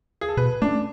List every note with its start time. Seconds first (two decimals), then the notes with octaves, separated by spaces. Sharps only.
0.21 G#4
0.29 A4
0.37 B2 B4
0.62 A3 C#4 D4